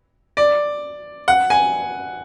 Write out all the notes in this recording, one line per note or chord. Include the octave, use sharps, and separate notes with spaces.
D5
F#5
G#5